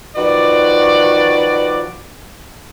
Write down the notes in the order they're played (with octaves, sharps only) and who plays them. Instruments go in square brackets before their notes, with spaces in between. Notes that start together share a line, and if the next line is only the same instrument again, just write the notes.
[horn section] D#3 F3 F#4 B4 D5